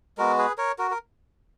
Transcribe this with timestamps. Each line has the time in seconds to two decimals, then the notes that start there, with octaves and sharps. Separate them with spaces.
0.18 G#3 B3 F#4 A#4
0.38 G#4 B4
0.58 A#4 C#5
0.79 F#4 A#4
0.91 A#4